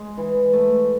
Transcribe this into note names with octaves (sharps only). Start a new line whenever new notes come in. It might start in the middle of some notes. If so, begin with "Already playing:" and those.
Already playing: G#3
E3
A3